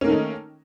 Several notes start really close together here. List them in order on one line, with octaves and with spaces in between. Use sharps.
C#4 A#3 D#3 A3 D#4